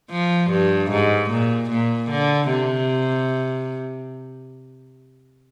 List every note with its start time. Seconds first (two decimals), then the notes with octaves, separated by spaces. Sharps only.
0.11 F3
0.51 G2
0.91 G#2
1.30 A#2
1.70 A#2
2.10 D3
2.49 C3